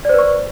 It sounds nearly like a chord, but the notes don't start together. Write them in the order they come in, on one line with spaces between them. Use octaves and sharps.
D5 C5 B4 C#6